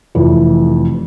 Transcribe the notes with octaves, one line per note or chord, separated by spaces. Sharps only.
F1 F2 E3